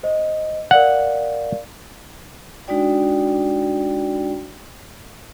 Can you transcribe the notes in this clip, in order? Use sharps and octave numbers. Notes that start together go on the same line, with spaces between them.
C5 D#5
A#4 D5 F5 F#5
G#3 D4 D#4 F#4 D5 G5